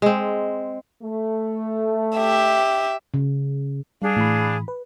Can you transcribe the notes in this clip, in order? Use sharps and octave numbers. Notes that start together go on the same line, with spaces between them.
G#3 C4
A3
G4 E5
C#3
G3 D4 G#4 F5
A2 E3 B5
B4